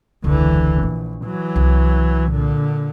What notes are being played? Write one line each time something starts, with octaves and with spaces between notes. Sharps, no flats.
E1 C#2 D3 E3
A#1 E4
E3 F#3
C2
A#2 D3